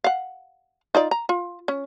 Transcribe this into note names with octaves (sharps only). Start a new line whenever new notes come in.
F5 F#5
D#4 F4 D5
A#5
F4
C#4